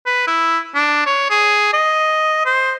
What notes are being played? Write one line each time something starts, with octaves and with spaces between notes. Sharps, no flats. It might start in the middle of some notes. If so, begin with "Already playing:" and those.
B4
E4
D4
C#5
G#4
D#5
C5